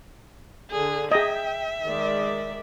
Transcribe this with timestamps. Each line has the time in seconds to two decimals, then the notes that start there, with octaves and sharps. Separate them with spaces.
0.71 D3 G#4
1.12 G#4 D#5 E5 G5
1.84 D#3 G#3 D5